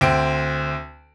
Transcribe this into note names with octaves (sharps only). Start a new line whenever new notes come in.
D2 C4 D7